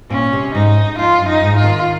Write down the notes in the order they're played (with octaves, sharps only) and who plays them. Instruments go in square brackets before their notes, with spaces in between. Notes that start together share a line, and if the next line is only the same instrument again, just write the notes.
[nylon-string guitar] A#2 [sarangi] C#4
[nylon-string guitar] C3
[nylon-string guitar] G#2 [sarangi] D#4
[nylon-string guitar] F2 [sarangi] F4
[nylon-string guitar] F#2
[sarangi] D#4
[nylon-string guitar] G#2
[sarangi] F4
[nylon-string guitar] D#3